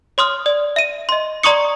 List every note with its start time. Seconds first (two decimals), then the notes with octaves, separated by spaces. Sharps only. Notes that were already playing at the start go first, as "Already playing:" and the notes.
0.18 C#5 C6 D#6 F6
0.46 D5
0.76 E5 D#7
1.09 D#5 C6
1.43 D5 A#5 C6 C#6 D#6 C#7